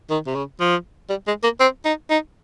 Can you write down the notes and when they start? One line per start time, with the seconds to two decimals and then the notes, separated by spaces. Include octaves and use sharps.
0.10 D#3
0.26 C3
0.35 C#3
0.60 F3
1.09 G3
1.27 G#3
1.43 A#3
1.60 C4
1.85 D#4
2.10 D#4